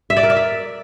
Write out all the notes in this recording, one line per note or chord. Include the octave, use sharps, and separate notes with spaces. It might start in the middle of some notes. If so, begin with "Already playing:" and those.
E5
D5
A#4
D5
E5